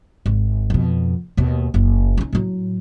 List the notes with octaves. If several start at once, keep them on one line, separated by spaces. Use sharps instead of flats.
G#1
F2 B2
D#2 B2
F#1
C#4 D#4
A2 F#3